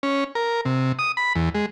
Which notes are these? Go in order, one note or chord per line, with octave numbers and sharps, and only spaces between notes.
C#4
A#4
C3
D#6
B5
E2
G#3